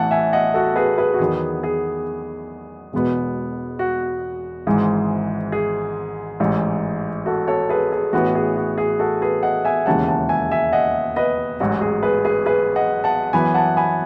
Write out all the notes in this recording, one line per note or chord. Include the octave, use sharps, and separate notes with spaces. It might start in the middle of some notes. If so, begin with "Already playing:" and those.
Already playing: A1 A2 E3 F#5 A5
E5 G#5
D#5 F#5
F#4 A4
G#4 B4
G#4 B4
F#4
E2 D#3 F#3 B3 G#4
G#4
E1 E2 B2 G#3 B3
F#4
G#1 G#2 E3 G#3
G#4
A1 G#2 E3
F#4 A4
A4 C#5
G#4 B4
G#4
A1 A2 E3 B3 F#4
G#4
F#4
G#4
F#4 A4
G#4 B4
D#5 F#5
E5 G#5
E1 D#2 C#3 E3 G#3 F#5 A5
F#5 A5
E5 G#5
E5 G#5
D#5 F#5
B4 D#5
A1 G#2 F#3 F#4
G#4
G#4 B4
G#4 B4
G#4 B4
D#5 F#5
F#5 A5
F#2 E3 B3 G#5 B5
F#5 A5
G#5 B5